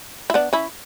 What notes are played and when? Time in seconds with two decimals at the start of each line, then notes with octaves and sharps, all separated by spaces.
0.30 E4
0.34 B3 D4
0.53 C#4 E4